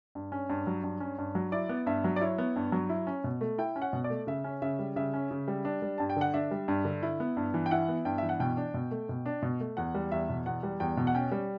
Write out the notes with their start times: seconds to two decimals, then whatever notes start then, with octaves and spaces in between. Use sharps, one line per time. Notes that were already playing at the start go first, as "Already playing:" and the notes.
0.15 G2
0.32 C#4
0.50 G2
0.67 F#3
0.84 G2
1.00 C#4
1.18 G2
1.35 F#3
1.52 E4 D5
1.69 B3
1.87 G2 E5
2.04 F#3
2.16 D5
2.21 E4 C#5
2.38 B3
2.56 G2
2.72 F#3
2.89 E4
3.07 C#4
3.24 B2
3.41 A3
3.58 E4 G5
3.76 C#4
3.82 F#5
3.93 B2
4.04 D5
4.10 A3
4.27 C#3 E5
4.44 C#4
4.62 C#3 E5
4.79 G3
4.96 C#3 E5
5.14 C#4
5.31 C#3
5.48 G3
5.65 D4
5.82 G3
5.98 G2 A5
6.10 G5
6.16 D3 F#5
6.34 D4 E5
6.51 G3
6.68 G2
6.85 D3
7.03 E4
7.20 B3
7.37 G2
7.54 E3
7.66 G5
7.71 E4 F#5
7.88 B3
8.05 G2 G5
8.18 E3 E5
8.29 F#5
8.40 B2 G5
8.57 D4
8.74 B2
8.91 A3
9.09 B2
9.26 D4
9.42 B2
9.60 A3
9.77 E2 F#5
9.94 G3
10.12 E2 E5
10.29 B2
10.46 E2 F#5
10.63 G3
10.80 E2 G5
10.97 B2
11.07 F#5
11.15 C#4 G5
11.32 G3